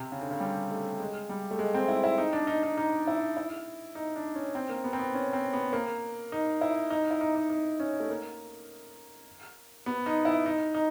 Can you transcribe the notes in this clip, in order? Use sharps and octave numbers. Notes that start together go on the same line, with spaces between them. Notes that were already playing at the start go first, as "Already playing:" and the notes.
Already playing: C3
C#3
D3
C#3
G3
A3
G#3
G3
A3
G#3
C4
E4
E4
D#4
D4
D#4
D#4
D#4
E4
E4
D#4
D4
C#4
C4
A#3
B3
C4
B3
C#4
C4
B3
A#3
D#4
E4
D#4
E4
D#4
D#4
D#4
C#4
A3
A#3
B3
D#4
E4
D#4
D#4